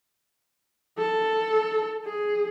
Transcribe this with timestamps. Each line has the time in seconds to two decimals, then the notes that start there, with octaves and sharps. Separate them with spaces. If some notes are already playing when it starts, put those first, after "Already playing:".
0.98 A4
2.05 G#4